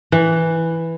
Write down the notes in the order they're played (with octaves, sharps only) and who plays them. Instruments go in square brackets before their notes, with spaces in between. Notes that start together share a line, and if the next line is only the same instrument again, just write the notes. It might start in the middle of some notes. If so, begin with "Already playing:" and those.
[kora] E3